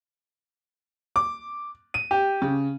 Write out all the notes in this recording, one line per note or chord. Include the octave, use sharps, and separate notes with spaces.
D6
D#7
G4
C#3